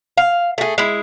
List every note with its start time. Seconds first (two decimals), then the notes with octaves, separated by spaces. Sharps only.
0.17 F5
0.58 A3 G#4
0.78 G#3 E4